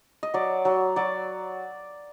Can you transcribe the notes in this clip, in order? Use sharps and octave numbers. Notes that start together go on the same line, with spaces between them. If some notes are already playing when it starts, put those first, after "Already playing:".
D#5
F#3 D5
F#3
F#3 D5